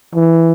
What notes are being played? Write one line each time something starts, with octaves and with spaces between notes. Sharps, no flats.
E3